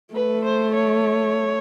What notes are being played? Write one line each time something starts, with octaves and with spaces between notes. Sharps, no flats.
A3 B4
C5
C#5